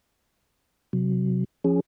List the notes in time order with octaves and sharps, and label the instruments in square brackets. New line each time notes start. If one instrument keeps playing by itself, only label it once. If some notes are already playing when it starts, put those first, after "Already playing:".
[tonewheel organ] C3 F#3
F3 C#4 G#4